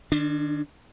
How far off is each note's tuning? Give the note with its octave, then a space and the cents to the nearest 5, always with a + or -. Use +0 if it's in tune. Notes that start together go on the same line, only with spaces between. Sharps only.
D#3 -35 D4 +0